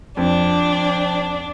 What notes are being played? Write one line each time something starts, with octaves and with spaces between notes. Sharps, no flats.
F2 D4